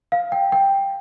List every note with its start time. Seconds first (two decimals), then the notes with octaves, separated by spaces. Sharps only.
0.12 F5
0.32 G5
0.52 G5